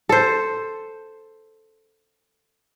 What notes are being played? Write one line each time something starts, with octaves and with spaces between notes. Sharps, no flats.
A4 C5